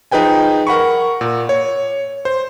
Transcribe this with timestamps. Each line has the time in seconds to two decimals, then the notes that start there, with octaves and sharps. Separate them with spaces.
0.11 F3 D#4 G#4 B4 G5 G#5
0.67 A#4 F#5 B5 C#6
1.21 A#2
1.49 C#5
2.25 C5